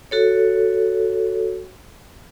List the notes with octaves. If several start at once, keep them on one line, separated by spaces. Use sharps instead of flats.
F#4 A4 C#5